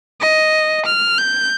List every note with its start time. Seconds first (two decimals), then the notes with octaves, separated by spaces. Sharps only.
0.21 D#5
0.86 F6
1.18 G6